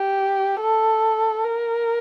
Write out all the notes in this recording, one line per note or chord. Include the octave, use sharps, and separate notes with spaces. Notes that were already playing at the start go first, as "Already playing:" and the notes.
Already playing: G4
A4
A#4